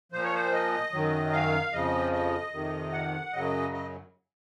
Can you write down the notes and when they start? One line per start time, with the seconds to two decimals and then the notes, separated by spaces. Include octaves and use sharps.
0.12 A#2 F3 C5
0.23 C#5
0.34 C5
0.52 D#5
0.92 F#2 D#3 F#3
1.33 F5
1.72 F2 C#3 F3 D#5
2.12 D#5
2.53 F2 C3 D#3
2.92 F#5
3.33 F#2 C#3 F#3 D#5
3.73 D#5